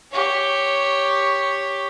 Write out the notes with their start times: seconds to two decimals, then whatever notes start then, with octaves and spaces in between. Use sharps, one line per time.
0.12 G4 C#5